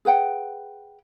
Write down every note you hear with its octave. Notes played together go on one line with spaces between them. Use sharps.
G#4 B4 F#5 G5